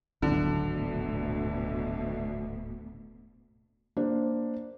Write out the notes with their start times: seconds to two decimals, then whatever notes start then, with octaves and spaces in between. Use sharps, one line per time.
0.22 D1 G#1 D2 B2 D3 F#3
3.97 A#3 D4 C5